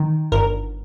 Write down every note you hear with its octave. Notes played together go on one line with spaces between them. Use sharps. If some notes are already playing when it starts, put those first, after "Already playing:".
Already playing: D#3
G1 A#4